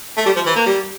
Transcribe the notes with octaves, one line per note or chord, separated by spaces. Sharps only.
A3
G3
F3
E3
A#3
G3